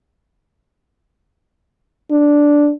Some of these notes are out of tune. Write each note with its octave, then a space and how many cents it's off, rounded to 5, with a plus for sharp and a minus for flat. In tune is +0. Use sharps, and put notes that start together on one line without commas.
D4 -5